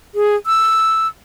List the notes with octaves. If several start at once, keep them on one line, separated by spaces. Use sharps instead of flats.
G#4
E6